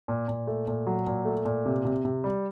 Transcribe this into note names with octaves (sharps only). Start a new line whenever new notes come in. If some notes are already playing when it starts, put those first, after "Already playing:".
A#2
A#2
A3
A#2
F#3
A#2
A3
A#2
C3
C3
C3
G3